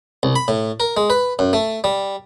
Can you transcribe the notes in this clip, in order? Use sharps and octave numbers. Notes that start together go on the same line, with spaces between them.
C2
B5
A2
A#4
G#3
B4
F#2
A3
G3